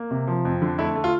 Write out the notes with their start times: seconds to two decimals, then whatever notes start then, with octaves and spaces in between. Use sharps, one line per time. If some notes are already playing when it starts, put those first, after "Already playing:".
Already playing: A#3
0.11 C3
0.27 F3
0.45 F2
0.62 D3
0.78 A3 E4
0.95 A3
1.04 F4